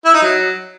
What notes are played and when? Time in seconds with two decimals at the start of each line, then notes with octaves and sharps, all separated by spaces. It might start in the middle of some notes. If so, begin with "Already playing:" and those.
0.05 E4
0.14 D#4
0.22 F#3